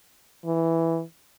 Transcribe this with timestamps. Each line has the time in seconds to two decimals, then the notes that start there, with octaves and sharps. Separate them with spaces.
0.45 E3